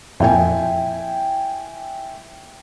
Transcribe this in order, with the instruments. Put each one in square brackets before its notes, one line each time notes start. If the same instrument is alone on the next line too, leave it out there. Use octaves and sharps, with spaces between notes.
[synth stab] F2 A#2 [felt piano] E4 G5 G#5